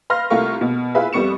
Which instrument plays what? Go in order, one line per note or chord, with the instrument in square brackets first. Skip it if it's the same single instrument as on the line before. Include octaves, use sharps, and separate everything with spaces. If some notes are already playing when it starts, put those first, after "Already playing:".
[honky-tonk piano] B4 F5 C6 F6 A#6
C2 A3 F4 A#4 C#6
B2
E4 F4 G#4 B4 E5
F2 G3 B3 C#6 C#7 E7